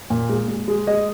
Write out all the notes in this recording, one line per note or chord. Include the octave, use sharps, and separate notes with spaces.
A#2
G#3
G#3
G#3
G#3 D#5